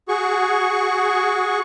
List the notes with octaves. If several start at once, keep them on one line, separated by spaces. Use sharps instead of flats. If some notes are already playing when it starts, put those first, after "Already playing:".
F#4 G#4 C#6